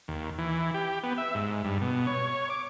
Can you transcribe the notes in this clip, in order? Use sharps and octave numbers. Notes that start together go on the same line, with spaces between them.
D#2
E3
G4
B3
E5
G#2
G2
B2
C#5
D6